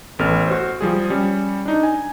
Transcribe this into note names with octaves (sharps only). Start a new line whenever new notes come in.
A1 B3 A4 F6
F#4 C5
F3 G3 G#4
G3 C#4
D4 D#4
G#5